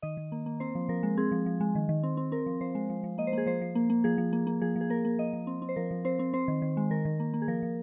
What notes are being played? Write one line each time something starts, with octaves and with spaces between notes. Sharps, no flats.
D#3 D#5
D#3
A#3
A#3
C4 C5
F3
F3 A#4
G#3
C4 G#4
F3
F3
G#3
D#3
D#3
C4
C4
C4 A#4
F3
F3 C5
G#3
F3
F3
A#3 D#5
C5
A#3 G#4
F3 C5
F3
A#3
A#3
F3 G#4
F3
A#3
A#3
F3 G#4
F3
G#4
A#3 A#4
A#3
F3 D#5
F3
C4
C4
C5
F3 A#4
F3
C4 C5
C4
C4 C5
D#3
D#3
G#3
D#3 A#4
D#3
A#3
A#3
G#4
F3 A#4
F3